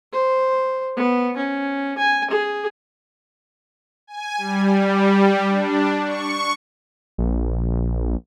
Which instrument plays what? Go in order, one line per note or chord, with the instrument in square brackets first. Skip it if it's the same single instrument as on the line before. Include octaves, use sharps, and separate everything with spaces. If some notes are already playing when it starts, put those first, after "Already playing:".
[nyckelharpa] C5
B3
C#4
G#5
G#4
[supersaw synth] G#5
G3
D4
C#6
[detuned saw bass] A#1